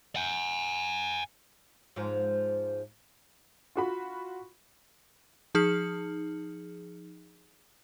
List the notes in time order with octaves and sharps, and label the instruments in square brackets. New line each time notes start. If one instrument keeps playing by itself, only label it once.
[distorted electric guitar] F#5 G#5
[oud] G#2 F3
[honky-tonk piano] F4 F#4 B5
[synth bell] F3 D#4 G#4 F6